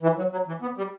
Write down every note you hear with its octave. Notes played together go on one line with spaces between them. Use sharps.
E3
F#3
F#3
E3
B3
G3